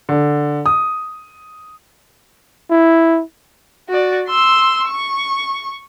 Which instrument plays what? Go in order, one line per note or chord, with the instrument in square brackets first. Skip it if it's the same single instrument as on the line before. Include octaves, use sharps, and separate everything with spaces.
[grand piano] D3
D#6
[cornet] E4
[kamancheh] F#4 D5
C6 E6
C#6